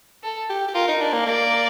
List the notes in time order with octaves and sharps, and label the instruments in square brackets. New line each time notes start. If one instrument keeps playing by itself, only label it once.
[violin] A4
[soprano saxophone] G4
G4
[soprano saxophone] F4 [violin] A#4
[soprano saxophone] D#4
D4
A#3
[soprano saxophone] A#3 [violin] D5